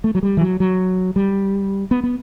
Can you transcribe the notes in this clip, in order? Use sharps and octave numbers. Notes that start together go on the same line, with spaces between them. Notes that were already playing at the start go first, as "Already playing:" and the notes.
A3
F#3
G3
E3
F#3
F#3
G3
B3
B3